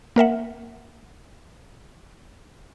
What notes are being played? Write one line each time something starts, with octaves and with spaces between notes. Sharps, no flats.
A#3 A#4 E5 F#5